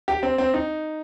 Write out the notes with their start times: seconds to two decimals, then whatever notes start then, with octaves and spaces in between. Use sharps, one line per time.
0.08 G4
0.23 C4
0.38 C4
0.54 D#4